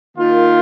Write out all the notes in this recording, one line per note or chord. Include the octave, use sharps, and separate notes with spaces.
D#3 A#3 F4